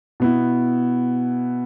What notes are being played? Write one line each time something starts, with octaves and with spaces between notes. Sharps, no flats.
B2 B3 E4